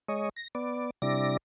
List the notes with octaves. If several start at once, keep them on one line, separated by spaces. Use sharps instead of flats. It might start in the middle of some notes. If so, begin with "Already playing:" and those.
G#3 C#5 D#5
A#6
B3 D5
C3 G3 D4 E4 D5 A#6